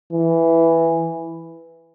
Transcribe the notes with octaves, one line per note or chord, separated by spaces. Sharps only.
E3